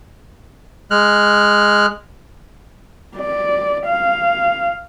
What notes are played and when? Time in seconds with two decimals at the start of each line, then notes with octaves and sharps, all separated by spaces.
0.91 G#3 F6 F#6
3.18 D5
3.87 F5